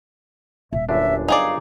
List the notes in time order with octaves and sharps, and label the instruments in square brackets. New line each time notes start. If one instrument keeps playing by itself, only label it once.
[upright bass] D#1 [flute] E5
[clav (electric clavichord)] G1 F#2 D4 [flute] E5
[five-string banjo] D#4 G#4 D5 [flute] F5